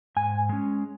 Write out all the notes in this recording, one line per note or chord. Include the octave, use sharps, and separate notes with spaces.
G#2 G#5
G#3 C#4